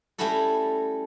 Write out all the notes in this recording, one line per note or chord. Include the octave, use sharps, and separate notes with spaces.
G3 A3 C#4 E4 F#4 A4